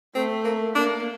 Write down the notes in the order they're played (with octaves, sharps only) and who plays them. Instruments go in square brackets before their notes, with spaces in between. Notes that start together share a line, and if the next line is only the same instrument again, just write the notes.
[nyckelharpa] A3 [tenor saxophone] C4
[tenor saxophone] A#3
[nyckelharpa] A#3 [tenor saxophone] D4